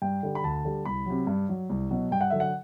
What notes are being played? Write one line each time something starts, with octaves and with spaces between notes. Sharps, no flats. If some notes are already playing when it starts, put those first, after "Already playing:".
G2 G5
D3 G3
B5
D2 A5
D3 G3
C2 B5
C3 F#3
G2
F#3
C2
B2 F#3
G2 G5
F#5
D3 F#3 E5
F#5